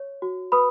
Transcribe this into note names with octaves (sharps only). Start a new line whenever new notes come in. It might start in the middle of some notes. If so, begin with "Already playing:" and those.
Already playing: C#5
F#4
B4 B5 D#6